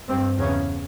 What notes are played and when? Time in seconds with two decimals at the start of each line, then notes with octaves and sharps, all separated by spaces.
0.08 G2 C4
0.38 E2 C#3 C#4